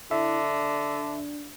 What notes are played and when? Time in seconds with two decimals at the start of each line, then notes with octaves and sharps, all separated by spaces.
0.11 D3 E4 E5
0.49 D4